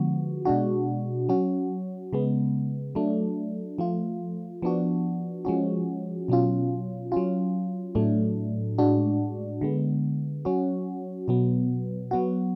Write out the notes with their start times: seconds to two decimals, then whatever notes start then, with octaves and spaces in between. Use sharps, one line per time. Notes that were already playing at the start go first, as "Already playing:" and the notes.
Already playing: D3 F3 G#3 B3 F#4
0.45 B2 G#3 D4 F#4
1.29 F#3 C#4 F#4
2.13 C#3 G#3 B3
2.95 F#3 A3 D4
3.78 F3 A3 F4
4.62 F3 B3 D4 F#4
5.45 F3 G#3 C#4 F#4
6.28 B2 F#3 C#4 F4
7.12 F#3 C#4 F4
7.95 A2 F#3 A3 D4
8.78 A2 G#3 D4 F#4
9.61 D3 G#3 B3
10.45 F#3 C#4 F#4
11.28 B2 F#3 B3
12.11 F#3 B3 F#4